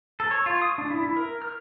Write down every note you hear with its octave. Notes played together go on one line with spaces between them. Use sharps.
A4
C#5
F4
D#6
D4
E4
E4
A#4
F6